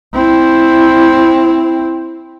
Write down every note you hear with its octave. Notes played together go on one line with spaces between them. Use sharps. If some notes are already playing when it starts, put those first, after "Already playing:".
C4 E4